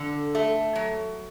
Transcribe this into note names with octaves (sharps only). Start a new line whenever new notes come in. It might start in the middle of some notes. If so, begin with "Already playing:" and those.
Already playing: D3
A3
F#3